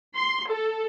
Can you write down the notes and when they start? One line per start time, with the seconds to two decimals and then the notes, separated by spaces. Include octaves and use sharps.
0.16 C6
0.49 A4